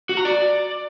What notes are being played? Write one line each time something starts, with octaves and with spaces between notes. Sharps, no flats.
F#4
A#5
D5